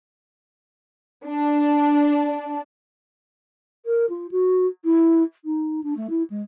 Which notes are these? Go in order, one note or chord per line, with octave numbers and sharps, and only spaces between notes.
D4
A#4
F4
F#4
E4
D#4
D4
A3
E4
G#3